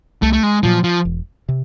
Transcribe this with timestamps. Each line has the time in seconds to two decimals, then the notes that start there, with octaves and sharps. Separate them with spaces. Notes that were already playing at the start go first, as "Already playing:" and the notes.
0.22 C2 A3
0.33 A3
0.43 G#3
0.63 A#2 F3 F#3
0.84 F3
1.05 E1
1.49 C3